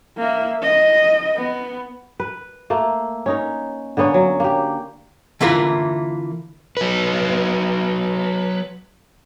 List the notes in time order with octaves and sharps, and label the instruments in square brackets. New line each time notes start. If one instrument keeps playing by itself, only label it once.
[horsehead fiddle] A#3 E5
D#5
B3
[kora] B4
A3 A#3
C#4 D#4 A#4
D3 A#3 B3 C#4
F#3
A#3 G4
[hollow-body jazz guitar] D3 E3 A#3 E4 F4 A#4
[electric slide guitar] F#3 B4